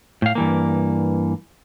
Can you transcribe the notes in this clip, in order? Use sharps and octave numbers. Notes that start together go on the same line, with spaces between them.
A2 F5
G2 E3 A#3